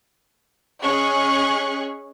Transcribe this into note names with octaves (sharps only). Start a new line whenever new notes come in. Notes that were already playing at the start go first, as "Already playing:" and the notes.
C#4 G#4 D#5 C#6 F#6